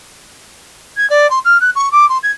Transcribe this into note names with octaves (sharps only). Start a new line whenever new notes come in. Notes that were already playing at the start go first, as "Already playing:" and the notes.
G#6
D5
C6
F6
F#6
C#6
D6
C6
G#6